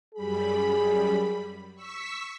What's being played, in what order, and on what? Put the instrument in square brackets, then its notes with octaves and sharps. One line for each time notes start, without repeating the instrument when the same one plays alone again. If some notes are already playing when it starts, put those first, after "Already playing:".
[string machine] F#2 G3 B5 [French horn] G#4
[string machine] C#6 E6 B6